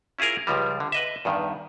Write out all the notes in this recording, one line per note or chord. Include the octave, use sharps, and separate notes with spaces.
C#4 E4 F4 G#4 A#4
C#2 F3 G3
D3
B4 D#5 E5
E2 G2 D#3